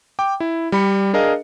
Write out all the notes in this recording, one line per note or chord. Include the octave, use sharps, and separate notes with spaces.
G5 D6
E4
G3 B5 C#7
D4 G#4 A#4 D#5 F5